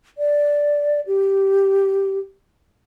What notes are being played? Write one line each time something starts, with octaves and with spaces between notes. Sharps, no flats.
D5
G4